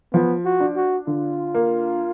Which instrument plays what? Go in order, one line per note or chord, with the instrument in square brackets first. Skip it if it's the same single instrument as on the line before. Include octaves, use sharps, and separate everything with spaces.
[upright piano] F3 [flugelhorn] B3
[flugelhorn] F#4
[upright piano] D4
[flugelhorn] F#4
[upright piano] D3 [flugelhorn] F4
[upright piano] A#3